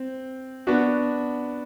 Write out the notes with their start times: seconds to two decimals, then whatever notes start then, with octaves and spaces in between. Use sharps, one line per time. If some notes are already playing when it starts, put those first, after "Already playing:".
Already playing: C4
0.67 B3 D4 F#4